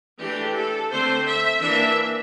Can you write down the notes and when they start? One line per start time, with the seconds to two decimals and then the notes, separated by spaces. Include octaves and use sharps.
0.19 E3 A3 D4 G4
0.55 A4
0.90 D3 A3 C4 C5
1.26 E5
1.61 E3 A#3 D4 E5